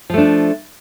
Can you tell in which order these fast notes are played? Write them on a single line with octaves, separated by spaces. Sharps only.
F3 A3 D4